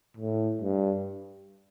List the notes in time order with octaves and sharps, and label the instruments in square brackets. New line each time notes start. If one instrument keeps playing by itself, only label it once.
[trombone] A2
G2